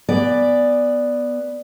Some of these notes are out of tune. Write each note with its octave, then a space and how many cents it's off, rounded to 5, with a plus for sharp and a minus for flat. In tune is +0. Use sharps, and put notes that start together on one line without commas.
B3 +0 D5 +0 G#5 -10